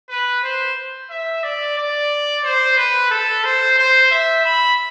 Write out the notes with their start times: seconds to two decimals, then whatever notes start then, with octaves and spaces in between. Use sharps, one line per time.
0.09 B4
0.43 C5
1.10 E5
1.43 D5
1.77 D5
2.44 C5
2.77 B4
3.11 A4
3.44 C5
3.78 C5
4.11 E5
4.45 B5